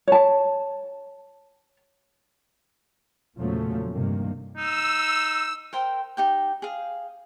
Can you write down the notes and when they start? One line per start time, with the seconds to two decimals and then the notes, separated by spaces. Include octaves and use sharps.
0.08 C#5 A5
3.37 E2 A#2 C#3 F3 F#3 A3
3.92 G2 C3 D#3 A#3
4.57 D#4 E6
5.73 A#4 C5 G5
6.17 D#4 G4 G5
6.62 G#4 F5